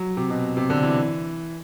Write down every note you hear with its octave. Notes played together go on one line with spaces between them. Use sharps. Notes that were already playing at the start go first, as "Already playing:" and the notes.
Already playing: F#3
C3
B2
C3
D3
E3